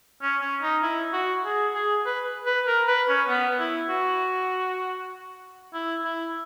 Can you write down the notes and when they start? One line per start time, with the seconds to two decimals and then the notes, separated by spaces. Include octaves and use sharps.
0.22 C#4
0.41 C#4
0.62 D#4
0.83 E4
1.13 F#4
1.45 G#4
1.74 G#4
2.06 B4
2.46 B4
2.67 A#4
2.88 B4
3.08 C#4
3.28 B3
3.59 E4
3.89 F#4
5.74 E4
6.04 E4